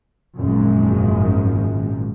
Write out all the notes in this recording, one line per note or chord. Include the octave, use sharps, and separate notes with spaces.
G#1 F#2 A#2 D#3 F3 G#3